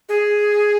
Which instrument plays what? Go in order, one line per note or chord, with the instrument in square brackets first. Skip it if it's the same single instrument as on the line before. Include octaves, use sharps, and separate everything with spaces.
[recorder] G#4